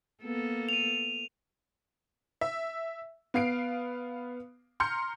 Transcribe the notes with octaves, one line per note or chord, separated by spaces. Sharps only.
A#3 B3 A4
D#7 F7
E5
B3 F5 C7 D7
A#5 C6 F6 G6 C#7